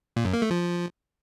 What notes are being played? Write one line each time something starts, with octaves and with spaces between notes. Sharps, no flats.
A#2
F#2
A#3
A3
F3